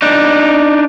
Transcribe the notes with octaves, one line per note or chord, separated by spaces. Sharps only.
D4 D#4